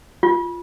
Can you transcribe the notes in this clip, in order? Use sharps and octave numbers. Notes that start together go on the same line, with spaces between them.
F4